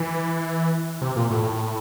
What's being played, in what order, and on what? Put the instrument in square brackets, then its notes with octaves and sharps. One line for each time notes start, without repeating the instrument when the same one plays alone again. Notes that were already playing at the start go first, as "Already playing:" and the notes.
Already playing: [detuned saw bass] E3
C3
A#2
A2
A2